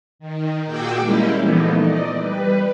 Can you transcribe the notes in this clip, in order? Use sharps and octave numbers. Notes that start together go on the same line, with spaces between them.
D#3
A#2 F#4 G#4 G5 D6 E6
G3 G#3 A#3 C#4 E4 G4
A#2 E3 F3 A3 B3 D#4
D5 D#5
G3 B4